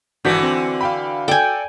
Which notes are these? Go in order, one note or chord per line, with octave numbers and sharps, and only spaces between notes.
G#1 D3 E3 F#4 G6 B6
C4
F5 G5 B5
A4 D5 G5 G#5